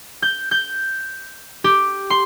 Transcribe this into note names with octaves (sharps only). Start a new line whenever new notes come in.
G6
G6
G4
C6